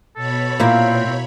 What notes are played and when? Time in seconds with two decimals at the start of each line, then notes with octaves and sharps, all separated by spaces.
0.16 B2 A4 C#5 B5
0.60 A#2 A#3 C4 E4 E5